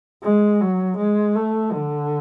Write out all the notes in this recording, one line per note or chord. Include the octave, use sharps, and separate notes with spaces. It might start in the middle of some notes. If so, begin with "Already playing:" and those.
G#3
F#3
G#3
A3
D3